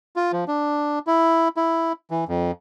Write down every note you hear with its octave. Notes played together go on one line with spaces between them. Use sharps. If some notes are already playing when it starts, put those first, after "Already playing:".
F4
F3
D4
E4
E4
E3
F2